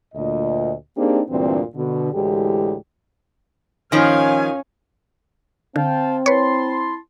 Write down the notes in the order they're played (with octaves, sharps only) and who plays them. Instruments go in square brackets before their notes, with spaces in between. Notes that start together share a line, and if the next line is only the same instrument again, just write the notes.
[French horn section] D2 A#2 D#5
A#3 C4 D4 D#4 G4 G#4
D2 G2 A#2 D3 E3 C4
B2 D3
D2 A2 E3 G#3 G4
[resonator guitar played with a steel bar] D#3 F3 [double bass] C#4 [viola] F5 G#5
[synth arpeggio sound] D3 [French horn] C4 [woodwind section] F5 G5 A5
[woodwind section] E4 A5 C6 [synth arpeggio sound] B4 C#5